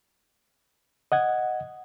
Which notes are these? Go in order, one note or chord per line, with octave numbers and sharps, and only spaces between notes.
D#5 F#5 G#6